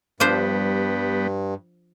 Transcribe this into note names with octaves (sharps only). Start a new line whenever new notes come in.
G2 F3 G3 B3 D4 C5